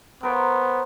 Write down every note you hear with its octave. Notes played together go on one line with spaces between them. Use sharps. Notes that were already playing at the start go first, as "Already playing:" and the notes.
B3 A#4 C5 C#5